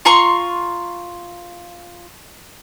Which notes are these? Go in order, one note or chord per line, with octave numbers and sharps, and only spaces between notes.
F4 A#5 C6 C#6